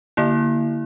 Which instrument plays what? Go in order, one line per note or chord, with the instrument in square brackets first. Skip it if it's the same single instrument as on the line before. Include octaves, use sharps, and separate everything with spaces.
[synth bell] D3 A#3 E4